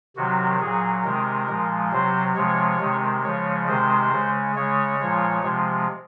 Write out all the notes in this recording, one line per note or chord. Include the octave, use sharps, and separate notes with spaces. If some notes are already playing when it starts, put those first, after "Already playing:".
C3 D#3 F#3 F#4
A#2 F#3 G#4
C3 D#3 G#3 A#4
A#2 F3 G#3
C3 F#3 C5
C3 F3 G#3 C#5
C3 D#3 G#3
C#3 F3 G#3 C#5
C3 D#3 G#3 C5
C#3 G#3
C#3 G#3 C#5
A#2 F3 G#3
C3 F3 G#3